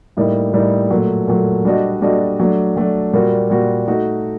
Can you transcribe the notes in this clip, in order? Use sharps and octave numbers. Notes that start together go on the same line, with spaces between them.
A2 G3 A#3 D#4
A2 G3 A#3 D#4
A#2 F#3 A3
A#2 F#3 A3
G3 D4 F#4 A4 D#5
G3 D4 F#4 A4 D#5
F#3 A3 D4
F#3 A3 D4
A#2 G3 A#3 F#4
A#2 G3 A#3 F#4
A3 D#4 F#4